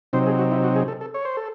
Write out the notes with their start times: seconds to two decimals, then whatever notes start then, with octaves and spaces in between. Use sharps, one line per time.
0.13 C3 F#3 C4 D#4 C5
0.26 G#4
0.38 F#4
0.51 E4
0.64 F#4
0.76 G#4
0.88 A4
1.01 A4
1.14 C#5
1.25 C5
1.37 A4